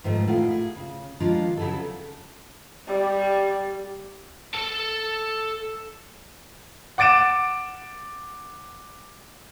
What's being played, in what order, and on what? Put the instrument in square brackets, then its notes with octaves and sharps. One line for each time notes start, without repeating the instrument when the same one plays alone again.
[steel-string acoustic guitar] G#2 D#3 F3 A3
A2 F4 F#5
G#4
C#3
D#3 F3 G#3 D4 F4
C#3 F#3 E4 G#4 A4
[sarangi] G3
[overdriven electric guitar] A4 A5
[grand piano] F#5 D6 A6 D7 E7